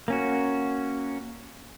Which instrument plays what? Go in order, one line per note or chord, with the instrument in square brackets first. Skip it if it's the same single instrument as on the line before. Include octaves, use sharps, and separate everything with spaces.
[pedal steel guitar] A#3 C#4 F#4